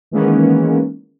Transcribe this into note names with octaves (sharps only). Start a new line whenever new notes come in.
D#3 E3 G#3 A#3 B3 C#4